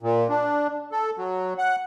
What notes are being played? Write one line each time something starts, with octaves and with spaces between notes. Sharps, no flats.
A#2
D4
A4
F#3
F#5